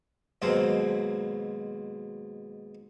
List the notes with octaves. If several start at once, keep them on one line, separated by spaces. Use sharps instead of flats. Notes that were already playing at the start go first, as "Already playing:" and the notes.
D#2 G#2 B2 F#3 C4